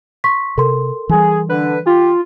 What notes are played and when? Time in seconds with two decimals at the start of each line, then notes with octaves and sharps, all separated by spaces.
0.24 C6 C#6 B6
0.58 C3 A4 A#4 C6
1.09 E3 G3 G#4
1.50 D3 B4
1.87 F4 G4